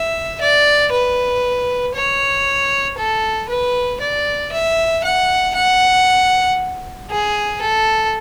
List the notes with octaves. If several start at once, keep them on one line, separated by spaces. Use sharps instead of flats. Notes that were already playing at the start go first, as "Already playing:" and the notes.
Already playing: E5
D5
B4
C#5
A4
B4
D5
E5
F#5
F#5
G#4
A4